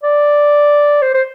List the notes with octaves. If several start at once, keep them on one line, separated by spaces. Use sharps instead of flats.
D5
C5
C5